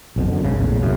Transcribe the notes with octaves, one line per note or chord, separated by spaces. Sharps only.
B1 F2 B2
F#2 D3
B1 G#2 C#3
A#1 E2 A2 C#3
C2 F#2 C#3